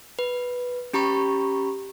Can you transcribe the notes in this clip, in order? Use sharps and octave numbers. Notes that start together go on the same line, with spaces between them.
B4
C#4 G4 A#5 B5 C#6